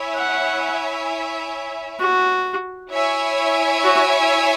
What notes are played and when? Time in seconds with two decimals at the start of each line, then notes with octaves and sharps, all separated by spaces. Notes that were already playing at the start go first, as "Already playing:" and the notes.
Already playing: E4 C#5 E5 G#5
0.16 F#5
2.00 F#4
2.91 E4 C#5 E5 G#5
3.84 F#4